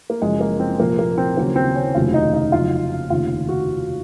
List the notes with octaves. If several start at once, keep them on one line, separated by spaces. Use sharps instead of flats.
A#3
F#1 F#2 F3 G#3
A#3
C4
C2 A#2 F3 A#3
A#3
C4
D#2 C#3 F#3 A#3
C4
C#4
F1 D#2 C#3 F#3 F4
D#4
D#4
F#1 F2 C#3 F#3 F4
F1 D#2 C#3 F4
F#4